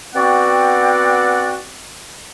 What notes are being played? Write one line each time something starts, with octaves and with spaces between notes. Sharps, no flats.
B3 C4 F#4 D5 F#5 G5